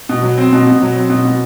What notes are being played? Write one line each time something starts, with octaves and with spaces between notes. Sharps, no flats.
B2
F#3
C4
B2
B2
F#3
C4
B2
B2